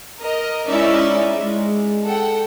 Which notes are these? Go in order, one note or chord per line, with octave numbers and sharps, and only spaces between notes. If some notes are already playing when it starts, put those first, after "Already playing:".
A#4 D#5
G#3 C#4 D#4 E4 D5 E5
G#3
A4 F#5 G5